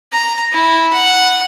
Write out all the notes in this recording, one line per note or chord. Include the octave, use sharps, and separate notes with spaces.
A#5
E4
F#5